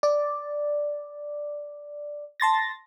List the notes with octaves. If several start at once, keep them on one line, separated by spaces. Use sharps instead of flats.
D5
A5 C6 A6 A#6